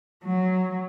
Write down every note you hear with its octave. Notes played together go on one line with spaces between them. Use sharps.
F#3